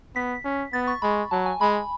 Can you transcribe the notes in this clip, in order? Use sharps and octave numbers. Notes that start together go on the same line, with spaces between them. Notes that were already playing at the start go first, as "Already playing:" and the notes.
B3 B6
C#4
B3 A6
C#6
G#3 B5
F#3 A5
G#5
G#3 B5